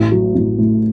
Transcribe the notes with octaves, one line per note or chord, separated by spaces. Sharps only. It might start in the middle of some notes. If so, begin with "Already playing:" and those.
Already playing: A1
F#3
A1
A2